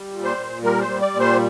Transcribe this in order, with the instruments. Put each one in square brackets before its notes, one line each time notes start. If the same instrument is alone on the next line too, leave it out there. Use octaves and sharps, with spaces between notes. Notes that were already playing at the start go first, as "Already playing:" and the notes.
Already playing: [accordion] G3
A#2
C5
A#2
G3 A#4
C5
G3
D5
A#2
C5